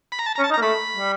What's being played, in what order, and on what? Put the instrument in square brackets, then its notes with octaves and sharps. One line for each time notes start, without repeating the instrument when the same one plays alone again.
[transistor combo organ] B5
A#5
A5
A#5
[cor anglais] C#4
[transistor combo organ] A5
[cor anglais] D#4
[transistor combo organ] A#5
[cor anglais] A#3
[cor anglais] A3 [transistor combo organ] B5
[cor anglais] G3